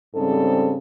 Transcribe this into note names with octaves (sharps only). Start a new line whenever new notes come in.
G#2 C#3 G3 C4 A4